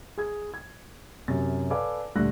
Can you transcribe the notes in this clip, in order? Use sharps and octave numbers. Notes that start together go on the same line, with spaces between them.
G#4 G#6
G#6
F#2 C3 A6
A4 B4 D5 F5 G#5 D6
D#1 D3 G3 A3 F#6 A#6